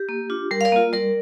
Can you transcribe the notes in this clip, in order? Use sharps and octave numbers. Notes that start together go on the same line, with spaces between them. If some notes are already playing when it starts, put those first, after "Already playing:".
Already playing: G4
A#3
D4 F4
G3 A#4
F5
A#4 D5
A#3 F4
G3 A#4 D5